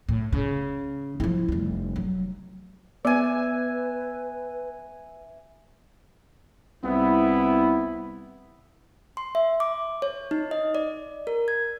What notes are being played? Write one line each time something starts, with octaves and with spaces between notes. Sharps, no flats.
A2
C#3
F3 E4
F1 G3
F#3
B3 B4 D5 E5 G#5
C2 B3 E4
C6
E5
D6
C#5
D#4
D#5
D5
A#4
G#6